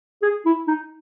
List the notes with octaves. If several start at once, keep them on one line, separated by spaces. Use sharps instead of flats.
G#4
E4
D#4